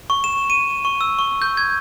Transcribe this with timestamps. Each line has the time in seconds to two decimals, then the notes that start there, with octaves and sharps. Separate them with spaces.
0.10 C#6
0.24 E7
0.50 D#7
0.85 C#6
1.01 E6
1.19 C#6
1.42 G6
1.57 G#6